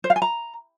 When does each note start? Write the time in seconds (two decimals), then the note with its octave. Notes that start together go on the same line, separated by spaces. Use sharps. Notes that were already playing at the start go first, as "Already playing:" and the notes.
0.04 C5
0.10 F5
0.16 G#5
0.22 A#5